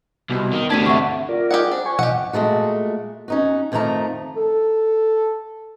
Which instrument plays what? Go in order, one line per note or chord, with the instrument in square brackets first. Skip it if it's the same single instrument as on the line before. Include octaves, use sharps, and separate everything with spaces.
[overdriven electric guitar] C2 [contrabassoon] B2
[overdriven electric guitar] D#3
[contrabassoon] D2 [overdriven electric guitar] C3 D4 [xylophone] G#6 B6 D#7
[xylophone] E5 F#5 C#6
[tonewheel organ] F4 A#4 D5
[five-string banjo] G4 G#4 F#5
[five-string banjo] D4 [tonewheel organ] C5
[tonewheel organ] G#5 C#6
[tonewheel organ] B2 F3 D#5 [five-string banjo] G4 F#5
[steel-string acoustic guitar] A#2 G#3 A3 F#4
C#4 D#4 F#4
F2 D#3 F3 A3 A#5
[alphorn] A4